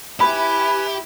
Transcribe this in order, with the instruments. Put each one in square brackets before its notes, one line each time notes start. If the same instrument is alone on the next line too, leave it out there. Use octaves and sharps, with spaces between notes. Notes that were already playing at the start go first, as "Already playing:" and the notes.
[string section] E4 [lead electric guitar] G4 [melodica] B4 G#5 [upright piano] B5